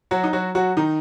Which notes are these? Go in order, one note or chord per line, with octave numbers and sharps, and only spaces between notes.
F#3 F#4
D#4
F#3 F#4
F#3 F#4
D#3 D#4